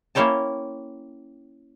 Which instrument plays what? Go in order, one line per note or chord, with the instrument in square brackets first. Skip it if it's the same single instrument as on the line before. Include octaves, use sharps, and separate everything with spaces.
[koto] A#3 C#4 E4 C#5 G5 A5